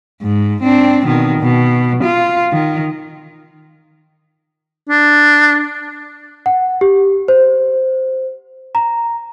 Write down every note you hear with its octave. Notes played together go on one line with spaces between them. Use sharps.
G#2
C4 D4
B2 D#3
B2
F4
D#3
D4
F#5
G4
C5
A#5